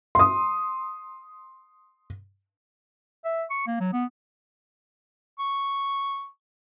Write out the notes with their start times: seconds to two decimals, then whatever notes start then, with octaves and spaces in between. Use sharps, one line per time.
0.15 C6 D#6
3.25 E5
3.50 C#6
3.67 A#3
3.80 F#3
3.93 B3
5.39 C#6